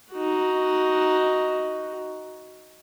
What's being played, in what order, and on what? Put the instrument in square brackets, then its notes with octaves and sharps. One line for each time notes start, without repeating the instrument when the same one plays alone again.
[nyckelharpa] D#4 F#4